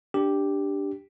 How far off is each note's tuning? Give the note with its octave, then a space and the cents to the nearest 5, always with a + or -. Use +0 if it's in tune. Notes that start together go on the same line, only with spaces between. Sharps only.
D4 -5 G4 +0